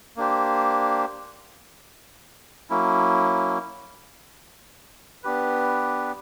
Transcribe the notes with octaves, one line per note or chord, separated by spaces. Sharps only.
A#3 D4 G4 C5
F#3 A#3 C#4 E4
B3 D4 G4 B4